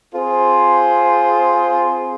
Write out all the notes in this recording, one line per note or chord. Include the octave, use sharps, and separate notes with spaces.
C4 F4 G#4 C5